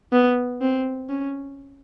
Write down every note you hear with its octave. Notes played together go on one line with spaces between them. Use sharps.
B3
C4
C#4